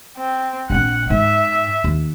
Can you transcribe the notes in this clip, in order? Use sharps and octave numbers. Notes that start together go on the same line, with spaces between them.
C4
A#1 C4 F#5
G#2 E5
D#2